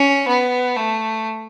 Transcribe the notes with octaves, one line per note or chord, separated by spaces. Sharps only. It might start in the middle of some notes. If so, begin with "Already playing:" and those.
Already playing: C#4
B3
A3